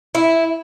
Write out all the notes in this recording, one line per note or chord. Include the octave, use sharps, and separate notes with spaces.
E4